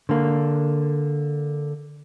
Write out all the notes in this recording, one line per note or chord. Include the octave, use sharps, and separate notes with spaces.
D3 A#3